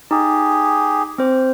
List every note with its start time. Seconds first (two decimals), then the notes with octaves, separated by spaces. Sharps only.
0.11 D#4 G4 G#4
1.18 C4 C5